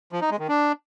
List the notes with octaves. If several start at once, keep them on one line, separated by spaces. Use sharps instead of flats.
F3
D#4
G#3
D#3
D4